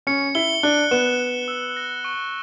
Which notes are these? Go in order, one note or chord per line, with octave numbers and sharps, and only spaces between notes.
C#4 C#7
E4 G7
D4 F#6
B3 E7
E7
E6
A#6
C#6